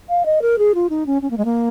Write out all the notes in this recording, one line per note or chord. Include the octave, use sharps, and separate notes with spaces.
F5
D#5
A#4
G#4
F4
D#4
C#4
C#4
A#3
G#3
A#3